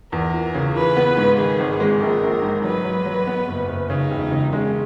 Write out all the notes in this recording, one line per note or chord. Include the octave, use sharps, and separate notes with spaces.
E2 A#4
E3
C#3
E3 B4
B3
G#2
D#3 G#4
G#1
G#3
A#1 A#4
A#1
G#2
F#3 B4
F#3
F#3
B3
F#1
F#1
C#3 D#4
E1
C#3
G#3 C#4